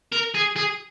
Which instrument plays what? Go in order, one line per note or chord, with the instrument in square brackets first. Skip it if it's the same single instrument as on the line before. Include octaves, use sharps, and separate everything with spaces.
[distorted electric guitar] A#4
G#4
G#4